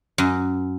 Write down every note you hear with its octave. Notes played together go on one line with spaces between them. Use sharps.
F#2